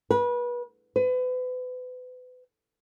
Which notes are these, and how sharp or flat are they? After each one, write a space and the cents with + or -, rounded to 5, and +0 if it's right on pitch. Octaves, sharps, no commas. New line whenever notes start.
B4 -30
B4 +35